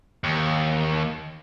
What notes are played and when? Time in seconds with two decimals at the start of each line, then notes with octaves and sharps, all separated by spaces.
0.24 D#2